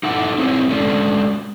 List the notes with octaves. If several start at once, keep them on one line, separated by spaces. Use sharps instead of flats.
D#4 E4 A4 F#5
C4 E4 G#4 C#5
G#3 C#4 D4 A4